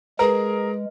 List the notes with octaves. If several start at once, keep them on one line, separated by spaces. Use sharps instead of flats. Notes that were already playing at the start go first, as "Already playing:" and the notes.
G#3 G#4 A#4 B4 A#5